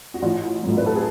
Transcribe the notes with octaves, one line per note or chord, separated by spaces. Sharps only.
F#4
A1 F4
A2 F#3
B4
A4
G#4